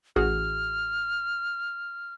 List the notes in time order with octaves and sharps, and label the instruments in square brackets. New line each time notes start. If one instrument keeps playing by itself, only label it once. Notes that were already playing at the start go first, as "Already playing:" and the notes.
[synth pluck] A1 F#4 G#4 [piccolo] F6